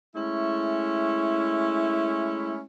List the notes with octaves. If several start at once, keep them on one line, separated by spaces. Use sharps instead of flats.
G#3 A3 C#4 E4